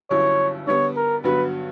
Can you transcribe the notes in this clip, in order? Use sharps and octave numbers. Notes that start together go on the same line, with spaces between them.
G1 G2 F#3 C#4 E4 C#5
D3 G3 B3 C#5
A#4
G2 D3 F#3 B3 F#4 B4